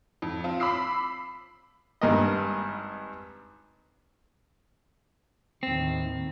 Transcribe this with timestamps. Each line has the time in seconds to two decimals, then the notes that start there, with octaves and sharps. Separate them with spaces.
0.22 F2
0.44 C4 F4
0.60 B5 D6 E6 C7
2.01 G#1 G2 A#4 D#5
5.63 D#2 A2 D#3 C4